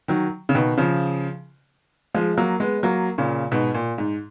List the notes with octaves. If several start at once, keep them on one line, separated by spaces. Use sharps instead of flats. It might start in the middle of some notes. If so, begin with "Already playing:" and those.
D#3 F#3
C#3
B2 D#3
C#3 F3
F3 G#3
F#3 A#3
G#3 B3
F#3 A#3
A#2 C#3
G#2 B2
A#2
G#2